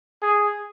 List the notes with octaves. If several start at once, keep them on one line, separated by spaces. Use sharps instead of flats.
G#4